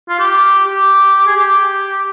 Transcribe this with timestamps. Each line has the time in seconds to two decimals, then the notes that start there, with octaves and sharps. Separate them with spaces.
0.09 F4
0.19 G4
0.66 G4
1.27 G#4
1.36 G4